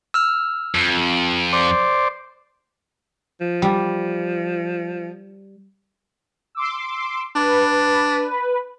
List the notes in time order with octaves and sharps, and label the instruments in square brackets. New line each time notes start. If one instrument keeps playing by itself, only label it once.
[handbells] E6 F6
[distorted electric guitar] F2
[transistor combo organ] C5 D5
[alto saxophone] F3
[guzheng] G3
[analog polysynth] C6 D6 E6
[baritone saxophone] D4 [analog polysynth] B4